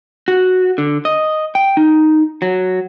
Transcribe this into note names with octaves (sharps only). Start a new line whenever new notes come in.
F#4
D3
D#5
G5
D#4
F#3